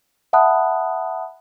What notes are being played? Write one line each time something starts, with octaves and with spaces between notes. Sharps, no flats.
E5 F#5 A5 B5 D#6 F#6